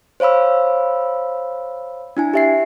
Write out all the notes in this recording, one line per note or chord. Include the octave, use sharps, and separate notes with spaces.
C5 C#5 F5 B5 E6
D4 E4 G#5
G4 E5 C7